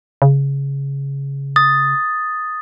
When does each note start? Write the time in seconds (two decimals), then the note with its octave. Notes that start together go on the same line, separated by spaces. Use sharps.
0.22 C#3
1.56 D#6 A6